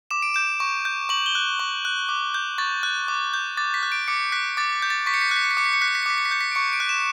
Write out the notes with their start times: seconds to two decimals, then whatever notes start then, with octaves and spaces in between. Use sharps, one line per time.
0.11 D6 E7
0.22 D7
0.34 G6 E7
0.60 C#6
0.85 G6
1.09 C#6 F#7
1.26 G7
1.35 F#6
1.60 C#6
1.85 F#6
2.09 D6
2.34 G6
2.58 C#6 A6
2.83 F#6
3.08 D6
3.34 G6
3.57 D6 A6
3.74 B6
3.83 F#6
3.92 D7
4.08 D6 C#7
4.32 F#6 B6
4.57 D6 A6
4.82 G6
4.90 A6
5.06 C#6 B6
5.14 C#7
5.21 B6
5.29 F#6 C#7
5.36 B6
5.44 C#7
5.51 B6
5.57 D6 C#7
5.66 B6
5.74 C#7
5.81 F#6 B6
5.88 C#7
5.95 B6
6.03 C#7
6.06 D6 B6
6.18 C#7
6.25 B6
6.31 G6 C#7
6.41 B6
6.51 D7
6.55 C#6 C#7
6.73 D7
6.80 F#6
6.89 E7